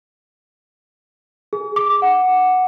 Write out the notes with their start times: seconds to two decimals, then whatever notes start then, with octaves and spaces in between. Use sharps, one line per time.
1.53 G#4
1.76 D6
2.02 F#5